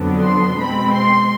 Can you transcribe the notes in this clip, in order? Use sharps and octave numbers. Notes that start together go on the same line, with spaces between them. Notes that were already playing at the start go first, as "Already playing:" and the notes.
Already playing: F2 D3 F#3 B3 D4
C6
B2 G#3 C4 B5
C6